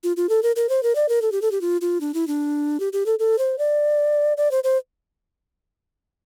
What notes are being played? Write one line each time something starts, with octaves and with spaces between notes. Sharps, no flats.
F4
F4
A4
A#4
A#4
C5
A#4
D5
A#4
A4
G4
A4
G4
F4
F4
D4
E4
D4
G4
G4
A4
A4
C5
D5
D5
C5
C5